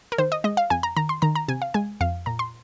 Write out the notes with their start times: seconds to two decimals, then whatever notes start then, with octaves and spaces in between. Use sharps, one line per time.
0.12 A#4
0.18 D#3 C5
0.32 D#5
0.44 G#3 D#5
0.57 F5
0.70 F2 G#5
0.83 A#5
0.97 D#3 A#5
1.09 C6
1.22 D#3 A#5
1.36 A#5
1.48 C3 G#5
1.62 F5
1.74 G#3 G#5
2.00 F2 F5
2.26 A#2 A#5
2.39 C6